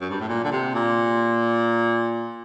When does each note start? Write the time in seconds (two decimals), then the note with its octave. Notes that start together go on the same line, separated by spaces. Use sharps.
0.01 F#2
0.10 G2
0.20 A2
0.29 A#2
0.44 D3
0.52 C3
0.74 A#2